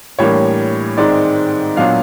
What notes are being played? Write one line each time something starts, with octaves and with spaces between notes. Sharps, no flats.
A2 E3 G3 A#3 D4 C#5
G#2 D#3 G#3 C4 D5
A#2 F#3 B3 D4 F5